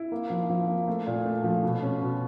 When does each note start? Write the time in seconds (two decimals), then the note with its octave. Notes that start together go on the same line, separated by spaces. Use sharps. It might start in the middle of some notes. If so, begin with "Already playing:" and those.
Already playing: E4
0.12 A#3
0.30 F3
0.49 F3
0.68 A#3
0.88 A3
1.07 A#2
1.25 A3
1.44 F3
1.63 B2
1.83 C#4
2.01 B2